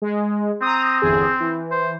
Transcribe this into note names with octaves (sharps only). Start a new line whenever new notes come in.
G#3
C4 A#5 D#6
G1 E2 G#4
E3
C5